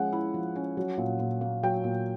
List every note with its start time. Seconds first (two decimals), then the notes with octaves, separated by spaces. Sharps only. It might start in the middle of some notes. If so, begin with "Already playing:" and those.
Already playing: F3 G#3 C#4 F#5
0.12 E4
0.34 F3
0.56 C#4
0.77 F#3
0.98 A#2
1.19 A#2
1.41 A#3
1.63 F#3 G5
1.84 A#2